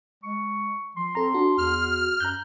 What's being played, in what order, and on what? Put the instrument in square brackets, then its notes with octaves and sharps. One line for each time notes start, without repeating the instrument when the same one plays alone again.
[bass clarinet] G#3 [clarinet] C#6
[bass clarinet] F3 [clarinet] C6
[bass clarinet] C4 [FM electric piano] A4 A#5
[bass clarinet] D4 [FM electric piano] F#4
[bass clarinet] E2 [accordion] F6
[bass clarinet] F#2 [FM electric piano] A#5 F#6 G6